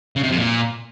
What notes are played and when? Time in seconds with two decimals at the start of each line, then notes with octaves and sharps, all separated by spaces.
0.16 C#3
0.23 C3
0.31 F2
0.38 A#2